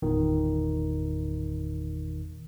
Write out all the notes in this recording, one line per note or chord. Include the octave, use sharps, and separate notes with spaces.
G1 E2 A#2 D#3